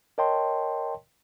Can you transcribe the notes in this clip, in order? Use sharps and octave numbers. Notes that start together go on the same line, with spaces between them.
A#4 C#5 D#5 G5 A5 C6